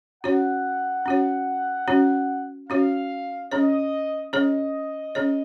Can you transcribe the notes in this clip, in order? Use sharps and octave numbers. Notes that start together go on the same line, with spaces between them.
C#4 F#4 C#5 F#5
C#4 F#4 C#5
C#4 F#4 C#5
C#4 F#4 C#5 F5
C#4 G#4 C#5 D#5
C#4 G#4 C#5 D#5
C#4 G#4 C#5